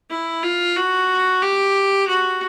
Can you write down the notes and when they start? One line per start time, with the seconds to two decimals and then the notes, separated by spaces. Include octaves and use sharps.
0.10 E4
0.43 F4
0.76 F#4
1.42 G4
2.08 F#4